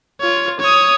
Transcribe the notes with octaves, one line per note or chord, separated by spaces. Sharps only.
F4 C#5
C#5 D#6